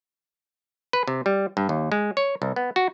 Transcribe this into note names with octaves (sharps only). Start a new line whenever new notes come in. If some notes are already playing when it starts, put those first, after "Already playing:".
B4
C3
G3
G2
D#2
G#3
C#5
C2
B3
F#4